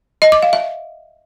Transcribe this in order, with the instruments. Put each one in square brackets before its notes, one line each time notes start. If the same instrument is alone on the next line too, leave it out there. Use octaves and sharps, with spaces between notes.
[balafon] D#5
D6
F5
E5